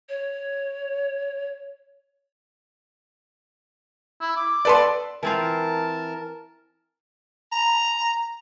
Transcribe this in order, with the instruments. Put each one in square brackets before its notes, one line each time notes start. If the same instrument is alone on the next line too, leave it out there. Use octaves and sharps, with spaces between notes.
[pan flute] C#5
[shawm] E4
D6
[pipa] B3 A4 B4 [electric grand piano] D5 C6
[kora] E3 C4 F4 [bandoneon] A#4 A5
[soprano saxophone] A#5